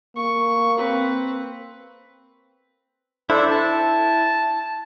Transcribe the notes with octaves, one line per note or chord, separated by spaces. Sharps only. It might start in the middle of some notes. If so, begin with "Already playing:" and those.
A#3 C#6
C4 B4
D4 E4 A4 C5
A5